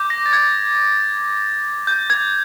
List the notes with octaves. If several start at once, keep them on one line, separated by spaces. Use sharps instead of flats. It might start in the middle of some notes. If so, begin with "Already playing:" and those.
Already playing: D6 G6
A#6
A6
G#6
G6
G#6